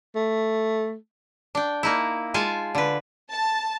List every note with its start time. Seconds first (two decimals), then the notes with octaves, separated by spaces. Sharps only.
0.15 A3
1.55 D4 G5
1.83 A#3 D#4 E4
2.34 G#3 F4 G#5 A5
2.75 D3 B4
3.30 A5